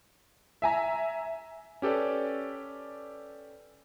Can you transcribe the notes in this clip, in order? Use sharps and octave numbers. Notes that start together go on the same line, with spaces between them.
E5 G#5 A#5
C#4 G4 A4 B4 D5